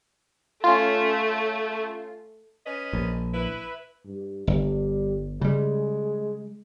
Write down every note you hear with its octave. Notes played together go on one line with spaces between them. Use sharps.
A3 C#4 F4
C#4 B4 D#5
A#1
E4 B4
G2
G1 G3
C#3 G3 G#3